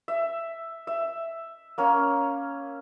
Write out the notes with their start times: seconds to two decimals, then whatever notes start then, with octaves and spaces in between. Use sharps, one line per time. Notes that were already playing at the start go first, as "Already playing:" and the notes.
0.08 E5
0.87 E5
1.78 A#3 C#4